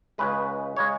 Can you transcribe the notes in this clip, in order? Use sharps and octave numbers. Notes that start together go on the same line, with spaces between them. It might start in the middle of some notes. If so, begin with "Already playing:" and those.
C#2 C#3 G#3 B4
C#3 G#3 C#5